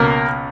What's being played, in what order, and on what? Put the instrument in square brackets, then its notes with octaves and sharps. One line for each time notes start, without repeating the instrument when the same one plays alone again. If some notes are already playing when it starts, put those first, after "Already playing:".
Already playing: [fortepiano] C#2 B2 A#3 A#4